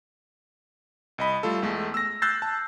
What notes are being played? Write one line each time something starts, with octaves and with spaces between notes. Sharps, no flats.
C2 D#5 B5
G3 A3 F4 A4
E2 G#3 A3
E6 A#6
E6 F#6 G6 A6 C7
A5